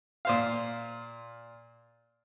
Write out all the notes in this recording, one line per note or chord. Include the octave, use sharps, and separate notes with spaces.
A#2 C5 F5